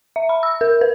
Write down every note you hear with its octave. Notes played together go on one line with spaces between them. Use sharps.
E5
B5
E6
A#4
B4